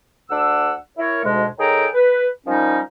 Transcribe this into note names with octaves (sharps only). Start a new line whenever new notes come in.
D2 D4 F#5 E6
E4 A#4 C#5
D2 G#2 B2 G#3
D#3 G#4 A4 C#5 G5 A#5
B4
D#3 F3 G3 C#4 D#4